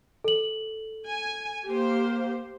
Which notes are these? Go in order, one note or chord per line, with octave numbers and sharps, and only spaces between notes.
A4 F#7
G#5
A#3 G4 C5